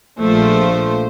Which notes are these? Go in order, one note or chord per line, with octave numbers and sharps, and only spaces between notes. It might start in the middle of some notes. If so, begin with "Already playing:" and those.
A#1 A#2 F3 A3 C5